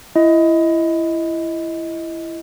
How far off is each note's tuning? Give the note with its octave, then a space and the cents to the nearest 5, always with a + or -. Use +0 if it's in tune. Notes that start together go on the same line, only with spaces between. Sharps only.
E4 +20 D#5 +20